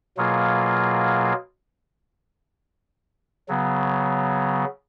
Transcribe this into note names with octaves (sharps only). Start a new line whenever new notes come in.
B2 F#3 A#3 F4 G#4
C#3 F#3 B3